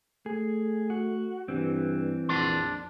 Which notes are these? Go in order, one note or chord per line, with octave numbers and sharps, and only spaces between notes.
A3 G#4
F#4
G2 E3 C4
A#1 F2 D4 C6